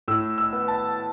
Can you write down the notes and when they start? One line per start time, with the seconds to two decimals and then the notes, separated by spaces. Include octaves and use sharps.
0.08 A2 E6
0.38 E6
0.53 B3
0.68 A5